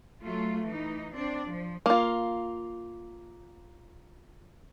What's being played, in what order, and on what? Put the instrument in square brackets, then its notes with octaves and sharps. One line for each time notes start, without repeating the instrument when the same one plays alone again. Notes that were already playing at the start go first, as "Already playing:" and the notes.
[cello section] F#3 A3 F4
E3 D#4
C4 D4 D5
F3
[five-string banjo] A#3 F4